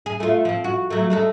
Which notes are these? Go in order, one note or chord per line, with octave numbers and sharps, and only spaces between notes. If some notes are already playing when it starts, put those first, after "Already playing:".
G#4
A3 F4
F3 C4
F#4
F#3 A3
G#3 A3 A4